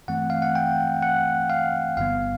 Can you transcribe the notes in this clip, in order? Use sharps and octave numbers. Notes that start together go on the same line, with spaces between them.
G2 E3 A3 C4 F#5
F5
F#5
G5
F#5
F5
G1 G2 D3 G3 B3 F5